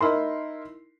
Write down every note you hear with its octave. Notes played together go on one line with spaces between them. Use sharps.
D#4 E4 A#4 C6